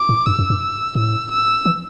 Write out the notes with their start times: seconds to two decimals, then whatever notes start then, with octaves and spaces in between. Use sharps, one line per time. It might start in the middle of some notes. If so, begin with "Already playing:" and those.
Already playing: D6
0.09 A2
0.26 G2 E6
0.39 F#2
0.50 G2
0.95 A2 E6
1.31 E6
1.66 E3